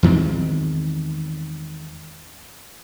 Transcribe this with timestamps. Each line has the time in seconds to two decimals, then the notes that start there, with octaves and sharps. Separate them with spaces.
0.03 E2 D#3 G#3 C4